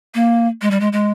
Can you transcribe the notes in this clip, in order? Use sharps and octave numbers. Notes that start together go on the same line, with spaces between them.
A#3
G#3
G3
G#3
G#3